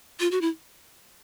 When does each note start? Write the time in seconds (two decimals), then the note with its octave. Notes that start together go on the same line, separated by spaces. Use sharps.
0.20 F4
0.31 F#4
0.41 E4